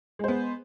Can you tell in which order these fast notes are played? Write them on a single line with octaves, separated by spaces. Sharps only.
G#3 C5 B3